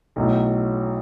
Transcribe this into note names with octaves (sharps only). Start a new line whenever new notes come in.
B1 A2 F#3